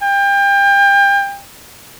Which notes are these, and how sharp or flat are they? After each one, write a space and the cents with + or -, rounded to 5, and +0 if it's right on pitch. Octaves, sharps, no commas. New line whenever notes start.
G5 +30